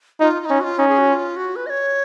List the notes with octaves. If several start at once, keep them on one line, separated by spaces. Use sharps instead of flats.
D#4 F4
F4
C#4 D#4
F#4
F4
C#4 D#4
G#4
F#4
F4
F#4
B4
D#5
C#5